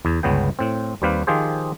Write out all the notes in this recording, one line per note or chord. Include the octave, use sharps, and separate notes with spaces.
E2
G1 C#2 C#3 B3 G5
A2 C4
D#2 G3 C4 G4 B4 F5
D#3 F3 F4 G4 G#4 C5